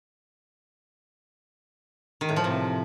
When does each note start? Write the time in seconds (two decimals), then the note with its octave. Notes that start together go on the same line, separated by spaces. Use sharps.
2.21 D#3
2.29 A2
2.36 F3
2.44 C3